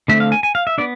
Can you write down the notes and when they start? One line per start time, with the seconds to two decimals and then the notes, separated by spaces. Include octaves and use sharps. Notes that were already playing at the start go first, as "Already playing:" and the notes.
0.08 D3 A3 C4 E5
0.20 F5
0.32 G#5
0.43 G#5
0.55 F5
0.67 E5
0.78 B3 D4 D5